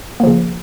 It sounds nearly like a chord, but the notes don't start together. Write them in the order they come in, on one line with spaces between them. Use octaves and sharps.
A#3 F3 C#3